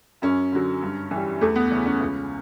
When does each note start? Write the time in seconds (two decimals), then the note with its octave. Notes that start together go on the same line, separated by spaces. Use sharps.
0.22 F#2 C#4
0.52 D3 F#3
0.82 G2
1.11 E3 G3
1.41 E2 A3
1.56 B3
1.70 C#3 E3 C#4
1.86 C#4
2.00 C#2